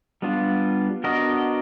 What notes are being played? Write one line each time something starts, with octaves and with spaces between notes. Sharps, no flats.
G3 B3 D4 F4
B3 D4 F#4 A#4 D#5